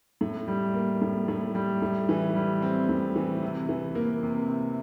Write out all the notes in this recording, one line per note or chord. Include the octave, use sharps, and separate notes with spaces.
A2
G3
A#3
A2
A2
G3
A2
E3
G3
C4
A2
E3
C3
E3
A#3
C3
C3